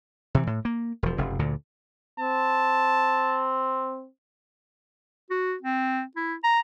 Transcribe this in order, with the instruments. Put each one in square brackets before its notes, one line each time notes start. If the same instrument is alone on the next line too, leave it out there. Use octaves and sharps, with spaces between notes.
[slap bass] C3 E3
A2
A#3
E1 F3
F1 F#2 C#3
D2 A#2 D3
[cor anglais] C4 [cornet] A5
[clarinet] F#4
C4
E4
A#5